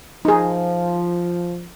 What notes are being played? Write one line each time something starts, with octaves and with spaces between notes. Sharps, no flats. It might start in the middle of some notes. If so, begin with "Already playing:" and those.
F3 D#4 G#4